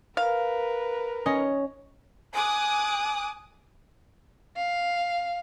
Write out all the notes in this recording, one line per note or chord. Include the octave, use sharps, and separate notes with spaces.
A#4 B4 F5
C#4 D#5
G#5 D6 D#6 F#6
F5